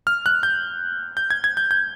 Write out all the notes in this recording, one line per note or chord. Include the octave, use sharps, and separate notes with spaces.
F6
F#6
G6
G6
G#6
G#6
G6
G6